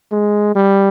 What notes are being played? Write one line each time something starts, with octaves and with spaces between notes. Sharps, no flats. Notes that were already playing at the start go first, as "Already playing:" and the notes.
G#3
G3